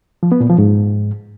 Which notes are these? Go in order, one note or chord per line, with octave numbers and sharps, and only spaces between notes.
F3
B3
A#2
F3
G#2